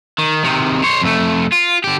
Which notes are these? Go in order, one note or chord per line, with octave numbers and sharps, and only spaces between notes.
D#3
C3 D#3
C5 C#5
F2 A3
F4
D3 G4